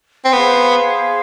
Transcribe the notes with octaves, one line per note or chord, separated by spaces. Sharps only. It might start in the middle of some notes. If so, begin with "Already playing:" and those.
C4
B3 G#4 C5 F5